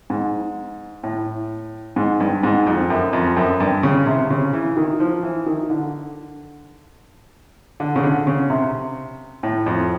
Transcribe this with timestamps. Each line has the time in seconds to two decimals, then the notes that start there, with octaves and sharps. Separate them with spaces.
0.10 G#2
1.03 A2
1.96 G#2
2.20 G2
2.43 G#2
2.67 F2
2.90 F#2
3.13 F2
3.37 F#2
3.60 G2
3.83 C#3
4.07 C3
4.30 C#3
4.53 E3
4.77 D#3
5.00 F3
5.23 E3
5.46 D#3
5.70 D3
7.80 D3
7.96 C#3
8.03 D3
8.27 C#3
8.50 C3
9.43 A2
9.66 F2